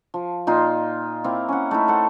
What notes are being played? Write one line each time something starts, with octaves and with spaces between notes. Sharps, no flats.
F3
A#2 D#4 F4 C6
A#3 C4 E4 A#5
C#4 F#5
A3 D#4 E4
A4 C5 F#5